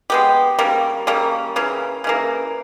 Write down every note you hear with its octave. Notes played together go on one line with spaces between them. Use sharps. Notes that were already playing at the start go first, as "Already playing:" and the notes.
G#3 B3 G4
C#3 G3 A#3
C#3 G3 A#3
C#3 E3 A#3
C#3 E3 A#3